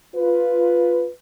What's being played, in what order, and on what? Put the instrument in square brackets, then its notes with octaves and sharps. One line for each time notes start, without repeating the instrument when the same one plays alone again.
[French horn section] F4 B4